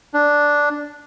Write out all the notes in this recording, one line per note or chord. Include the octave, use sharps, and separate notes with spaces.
D4